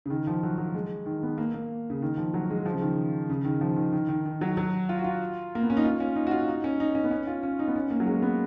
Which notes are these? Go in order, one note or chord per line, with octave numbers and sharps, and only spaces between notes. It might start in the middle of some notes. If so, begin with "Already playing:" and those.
C#3
D#3
F3
F#3
F#3
G#3
D#3
B3
A#3
A#3
C#3
D#3
F3
F#3
G#3
F3
C#3
D#3
C#3
D#3
F3
D#3
D#3
D#3
D#3
F#3
F#3
F4
F#4
F4
A#3
B3
C#4
D#4
F4
C#4
D#4
F#4
F4
D#4
C#4
D#4
C#4
B3
C#4
F4
C#4
D#4
B3
C#4
A#3
F#3
G#3
B3